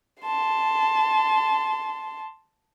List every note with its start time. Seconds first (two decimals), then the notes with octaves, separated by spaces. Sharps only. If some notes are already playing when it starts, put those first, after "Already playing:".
0.22 A5 C6